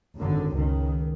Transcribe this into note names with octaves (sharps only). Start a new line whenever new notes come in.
G#1 F#2 D3
C#2 D#3